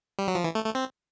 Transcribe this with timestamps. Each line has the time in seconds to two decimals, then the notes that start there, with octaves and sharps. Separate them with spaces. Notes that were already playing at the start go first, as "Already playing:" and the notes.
0.19 G3
0.28 F#3
0.35 F3
0.44 E3
0.55 A3
0.65 A3
0.75 C4